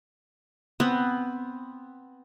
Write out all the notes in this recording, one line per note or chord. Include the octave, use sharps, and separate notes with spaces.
B3 C4